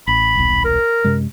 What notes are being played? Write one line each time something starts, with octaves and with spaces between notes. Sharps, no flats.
A1 B5
D#1 B1
A#4
F#2 C3 G#3